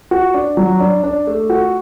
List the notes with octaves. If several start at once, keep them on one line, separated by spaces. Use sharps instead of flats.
F#4
D4
F#3
D4
D4
A3
F#4